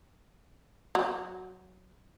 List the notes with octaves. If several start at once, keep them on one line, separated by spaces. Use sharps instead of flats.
F#3